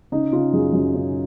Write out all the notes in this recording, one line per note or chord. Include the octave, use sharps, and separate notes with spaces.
C#3 D#4
C#3 F4
F#2 G#4
F#2
C#3